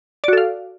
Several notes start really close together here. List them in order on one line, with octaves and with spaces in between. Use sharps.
D5 F#4 A4 F5